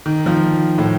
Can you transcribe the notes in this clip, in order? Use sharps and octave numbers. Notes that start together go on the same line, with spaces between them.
D#3
F3
A2